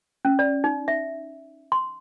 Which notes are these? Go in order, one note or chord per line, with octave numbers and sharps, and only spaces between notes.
C#4
D5
D#4
E5
C6